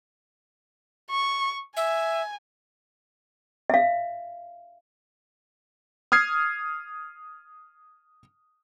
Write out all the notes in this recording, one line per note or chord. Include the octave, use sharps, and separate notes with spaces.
C#6
E5 G#5
E5 F5
D#6 F6 G#6 C7